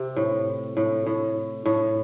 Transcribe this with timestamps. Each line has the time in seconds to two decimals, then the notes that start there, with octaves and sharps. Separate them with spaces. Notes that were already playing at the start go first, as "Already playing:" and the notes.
Already playing: C3
0.16 A2
0.77 A2
1.06 A2
1.65 A2